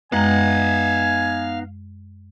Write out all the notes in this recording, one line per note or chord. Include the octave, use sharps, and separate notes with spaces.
F#2 G#3 B3 D#4 F5 F#5 G#5 A#5